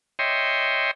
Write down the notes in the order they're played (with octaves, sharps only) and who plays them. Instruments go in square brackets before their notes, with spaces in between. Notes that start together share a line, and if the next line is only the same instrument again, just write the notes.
[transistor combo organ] C#5 D#5 E5 G5 C6